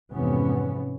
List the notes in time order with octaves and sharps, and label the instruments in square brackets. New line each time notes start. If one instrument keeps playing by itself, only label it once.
[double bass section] F2 G#2 C3 E3 B3 C#4